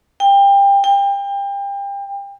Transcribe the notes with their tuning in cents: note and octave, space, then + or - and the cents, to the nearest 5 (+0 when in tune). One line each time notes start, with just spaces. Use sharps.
G5 +25
G5 +30